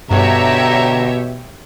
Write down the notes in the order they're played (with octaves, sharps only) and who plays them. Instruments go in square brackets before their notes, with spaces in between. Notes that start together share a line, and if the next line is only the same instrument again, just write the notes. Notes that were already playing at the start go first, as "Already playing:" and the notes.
[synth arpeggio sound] G2 [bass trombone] B2 [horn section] D3 A#5 [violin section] G4 C#5 E5